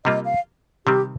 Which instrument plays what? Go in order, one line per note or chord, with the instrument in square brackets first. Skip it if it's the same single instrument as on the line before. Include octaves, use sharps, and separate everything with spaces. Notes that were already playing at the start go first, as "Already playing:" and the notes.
[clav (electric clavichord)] C3 G3 A#3 F4 [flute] D#5
[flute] F5
[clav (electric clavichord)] C3 D#3 G3 C4 [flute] G4